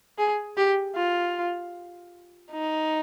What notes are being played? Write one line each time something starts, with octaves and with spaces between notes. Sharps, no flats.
G#4
G4
F4
D#4